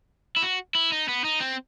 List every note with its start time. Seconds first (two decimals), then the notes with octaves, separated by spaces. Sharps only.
0.36 E4
0.43 F#4
0.75 E4
0.92 D#4
1.08 B3
1.24 D#4
1.40 C4